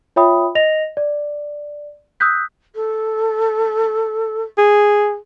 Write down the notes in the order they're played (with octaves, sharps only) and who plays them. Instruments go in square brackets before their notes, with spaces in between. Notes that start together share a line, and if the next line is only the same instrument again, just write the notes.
[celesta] F4 C#5 E5 G5 B5 D#6
D#5 A#6 F7
D5
D#6 E6 F#6 G6 B6
[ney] A4
[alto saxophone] G#4